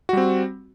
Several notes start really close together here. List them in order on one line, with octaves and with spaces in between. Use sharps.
F#4 G3 C4